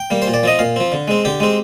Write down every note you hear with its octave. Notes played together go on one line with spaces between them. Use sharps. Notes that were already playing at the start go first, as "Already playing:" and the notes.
Already playing: G5
G3 A#3
C5
A#2
D5
F3 C4 D#5
A#2 F5
F3 C4
D3
G#3 C4
D3 G4
G#3 C4